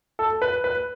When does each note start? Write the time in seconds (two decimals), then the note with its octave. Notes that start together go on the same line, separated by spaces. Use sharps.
0.19 A4
0.42 B4
0.64 B4